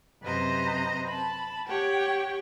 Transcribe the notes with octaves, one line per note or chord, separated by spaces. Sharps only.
F#2 C3 B4 C5 D#5 A#5
A5 B5
G4 C#5 F#5 G5